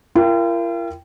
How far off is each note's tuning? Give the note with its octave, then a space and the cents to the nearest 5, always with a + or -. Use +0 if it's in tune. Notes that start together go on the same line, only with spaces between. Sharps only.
F4 -45 A#4 +0 G5 +0